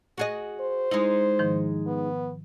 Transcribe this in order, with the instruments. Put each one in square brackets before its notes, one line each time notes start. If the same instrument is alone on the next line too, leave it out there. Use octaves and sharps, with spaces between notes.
[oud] F#4 G#4 D#5
[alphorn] C5
[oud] G#3 D#4 [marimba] E4
[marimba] G#2 D#3 F3
[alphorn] B3